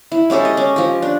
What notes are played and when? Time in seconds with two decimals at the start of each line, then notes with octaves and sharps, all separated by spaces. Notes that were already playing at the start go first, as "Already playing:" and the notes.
0.12 E4
0.30 G#3 C#4 G4 A4
0.45 D#5
0.57 C#4
0.76 F3 G4
1.02 D4